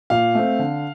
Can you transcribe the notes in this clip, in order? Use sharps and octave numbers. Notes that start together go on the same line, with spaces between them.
A#2 F5
A3 C4
D3